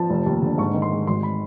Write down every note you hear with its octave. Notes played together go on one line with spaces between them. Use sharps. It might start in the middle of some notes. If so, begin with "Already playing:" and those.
Already playing: F3 A5
F1
D#2
D3
G#2 C#6
D#3
C6
G#3
G#1 C6
B5